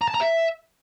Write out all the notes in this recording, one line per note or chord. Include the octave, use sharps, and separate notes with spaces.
A#5
A5
A#5
E5